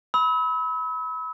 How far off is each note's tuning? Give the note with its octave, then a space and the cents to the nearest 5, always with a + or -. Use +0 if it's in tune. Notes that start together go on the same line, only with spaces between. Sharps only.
B5 +0 E6 -40